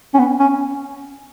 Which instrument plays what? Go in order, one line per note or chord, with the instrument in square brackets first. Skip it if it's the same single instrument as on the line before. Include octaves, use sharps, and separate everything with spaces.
[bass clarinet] C#4
B3
C#4